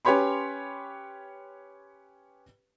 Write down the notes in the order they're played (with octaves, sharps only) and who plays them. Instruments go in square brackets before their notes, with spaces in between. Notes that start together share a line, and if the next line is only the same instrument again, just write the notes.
[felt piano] C#4 G4 B4 C#5 B5 C6